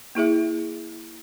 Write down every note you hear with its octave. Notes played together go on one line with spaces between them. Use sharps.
A#3 E4 G#4 E5